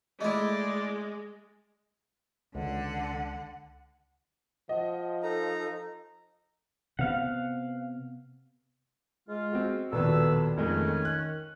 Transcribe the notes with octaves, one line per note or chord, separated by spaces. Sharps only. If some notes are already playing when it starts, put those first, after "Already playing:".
G#3 A3 E4 D5 D#5
C#2 D3 F#5
F3 D#5 F#5
D#4 A4 A#5
C3 B3 F5 F#5
G#3 F4
C4 F#4
A#1 D#2 B2 A4 B4 E6
F2 D#3 G#3 A3 C#4
F#6